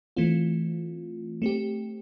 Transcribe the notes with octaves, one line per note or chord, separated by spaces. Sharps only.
E3 A3 C4 F4
A3 C4 G4